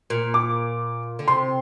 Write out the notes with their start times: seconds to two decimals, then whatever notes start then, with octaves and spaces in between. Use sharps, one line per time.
0.10 A#2
0.34 D6
1.19 D3
1.28 C3 C6